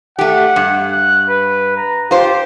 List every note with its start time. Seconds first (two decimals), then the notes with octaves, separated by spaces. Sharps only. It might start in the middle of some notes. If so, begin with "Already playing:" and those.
0.19 A3 G4 F#5
0.56 G2
0.92 F#6
1.29 B4
1.77 A#5
2.11 F4 G4 C5